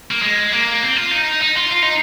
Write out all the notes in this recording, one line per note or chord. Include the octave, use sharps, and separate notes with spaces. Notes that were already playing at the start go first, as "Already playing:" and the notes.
A#3
G#3
A#3
C4
F4
D#4
D#4
F4
F4
D#4